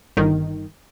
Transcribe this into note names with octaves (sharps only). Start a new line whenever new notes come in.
G1 D#3